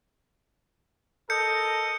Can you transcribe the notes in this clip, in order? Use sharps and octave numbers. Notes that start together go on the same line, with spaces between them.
A4 A#4 D#5 G6 C#7